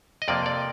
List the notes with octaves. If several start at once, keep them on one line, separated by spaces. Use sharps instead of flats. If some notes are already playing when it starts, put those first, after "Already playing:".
D#5
F2 C3 F3 A#3 D5
D5